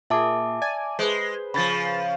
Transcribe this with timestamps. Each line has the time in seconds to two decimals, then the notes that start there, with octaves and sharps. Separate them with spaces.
0.10 A#2 G#4 E5 A5 D6
0.62 D5 G#5
0.99 G#3 B4 C5
1.54 C#3 F3 B5 A6